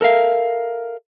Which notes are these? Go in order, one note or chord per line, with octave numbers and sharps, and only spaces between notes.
A4 A#4 E5 F5